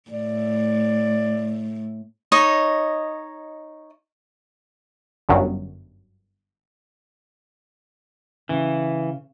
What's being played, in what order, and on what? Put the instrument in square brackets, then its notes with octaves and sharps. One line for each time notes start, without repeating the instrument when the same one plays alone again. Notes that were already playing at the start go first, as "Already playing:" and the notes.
[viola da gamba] A2 [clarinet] D5
[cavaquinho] D#4 C#5 D#5
[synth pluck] G1 F#2
[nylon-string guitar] C#3 [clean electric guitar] E3